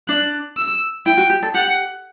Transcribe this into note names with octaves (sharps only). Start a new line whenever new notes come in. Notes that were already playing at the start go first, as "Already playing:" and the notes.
D4 F#6
E6
E4 G5
F#4
G4
A4
G4 F#5